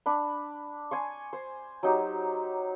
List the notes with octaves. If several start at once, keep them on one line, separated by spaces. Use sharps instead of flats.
D4 B5
G#5 C6 C#6
C5
F#3 D#4 G4